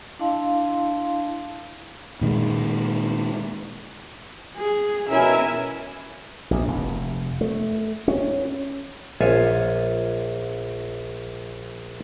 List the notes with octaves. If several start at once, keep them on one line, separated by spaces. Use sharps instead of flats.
D4 E4 D#5 F5 A5 C6
A#2 D#3 G#3
G#4
B2 C#4 E4 A#4 E5 G#5
A#1
F1
A3
C#4
A#1 F4 C#5 E5 G#5